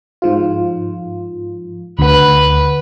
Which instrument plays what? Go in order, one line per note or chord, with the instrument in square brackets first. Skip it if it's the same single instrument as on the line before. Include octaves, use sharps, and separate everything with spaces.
[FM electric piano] G#2 F3 F4
[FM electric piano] D2 F#5 [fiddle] B4